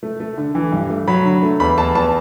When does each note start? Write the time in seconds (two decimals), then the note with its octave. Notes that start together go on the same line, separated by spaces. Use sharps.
0.03 A3
0.20 A3
0.38 D3
0.55 E3
0.72 G2
0.90 A3
1.08 F#3 B5
1.25 D3
1.43 A3
1.60 E2 B5
1.77 E2 A5
1.95 E2 A5